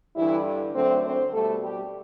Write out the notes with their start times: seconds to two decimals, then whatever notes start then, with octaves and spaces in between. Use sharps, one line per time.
0.16 G2 D3 E3 G3 E4
0.74 F#2 D3 F#3 A3 C4 C5
1.03 C4 C5
1.32 B2 G3 A3 A4
1.61 G3 G4